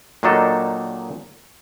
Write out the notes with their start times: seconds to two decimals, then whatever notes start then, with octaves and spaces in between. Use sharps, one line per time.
0.23 A#2 D#3 F#3 D4 D#4 A4